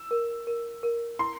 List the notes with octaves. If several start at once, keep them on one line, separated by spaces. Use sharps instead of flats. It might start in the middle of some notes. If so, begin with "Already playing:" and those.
Already playing: E6
A#4
A#4
A#4
E4 C6